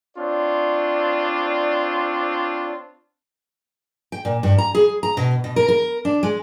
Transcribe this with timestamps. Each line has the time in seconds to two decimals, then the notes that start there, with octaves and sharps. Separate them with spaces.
0.17 C4 D4 F4 C#5 D5
4.12 G5
4.25 A#2
4.43 G2
4.58 A#5
4.75 G#4
5.03 A#5
5.17 B2
5.44 B2
5.56 A#4
5.68 A#4
6.05 D4
6.23 G#3